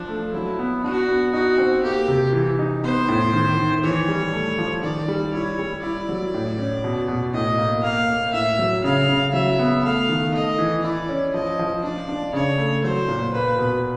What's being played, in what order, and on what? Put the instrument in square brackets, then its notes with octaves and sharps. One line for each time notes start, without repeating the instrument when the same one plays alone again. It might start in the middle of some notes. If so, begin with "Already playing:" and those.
Already playing: [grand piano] F3 [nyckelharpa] D4
[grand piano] A3
[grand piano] F#3 [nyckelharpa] E4
[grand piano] B3
[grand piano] D4 [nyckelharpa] F#4
[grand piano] B3
[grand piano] D#4 [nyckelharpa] F#4
[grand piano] C4
[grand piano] A#3 [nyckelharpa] G4
[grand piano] C3
E3
D#4
[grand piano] B3 [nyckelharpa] C5
[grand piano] A2
D#3
D#3
[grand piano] E3 [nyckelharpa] C#5
[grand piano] G3
A3
F3
[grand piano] D#3 [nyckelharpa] D5
[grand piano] G3
[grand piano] E4 [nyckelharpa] C#5
[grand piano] G3
[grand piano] E4 [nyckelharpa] D5
[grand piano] F#3
A2
C#4
B2
B2
[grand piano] A2 [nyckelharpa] D#5
[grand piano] A#3
[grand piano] A#3 [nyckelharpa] F5
[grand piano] A#3
[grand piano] A2 [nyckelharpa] E5
[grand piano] F#3
[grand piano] C#3 [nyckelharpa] F5
[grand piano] C#3
[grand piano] F#3 [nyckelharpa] E5
[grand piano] B3
[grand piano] A3 [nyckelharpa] F5
[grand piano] D#3
[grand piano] A3 [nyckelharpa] D#5
[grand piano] E3
[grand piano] E4 [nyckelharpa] D5
[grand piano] C#4
[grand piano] F3 [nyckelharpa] D#5
[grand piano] F3
[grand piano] D4 [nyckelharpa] D5
[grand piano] D4
[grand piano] C#3 [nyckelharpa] C#5
[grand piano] A3
[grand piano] F#3 [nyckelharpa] C5
[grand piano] A#2
[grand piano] A#3 [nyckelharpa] B4
[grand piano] B2